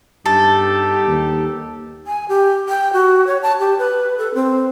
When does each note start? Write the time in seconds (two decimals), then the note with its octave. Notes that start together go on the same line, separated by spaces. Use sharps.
0.26 G2 B3 D#4 G4 A4
1.07 D#2
2.07 G#5
2.29 G4
2.69 G5
2.93 F#4
3.27 C#5
3.43 A5
3.60 G4
3.79 B4
4.18 A4
4.35 C4